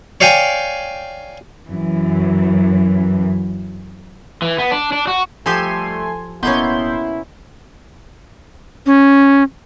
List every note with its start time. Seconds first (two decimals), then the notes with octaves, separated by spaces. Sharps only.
0.21 C#5 D5 F5 G5 G#5
1.66 F#2 E3
4.42 E3
4.58 B3
4.71 D4
4.93 D4
5.07 F#4
5.46 F3 G3 A3 G4 A4 G#5 C6
6.43 D1 B2 A#3 B3 C#4 E4 C6 G6
8.86 C#4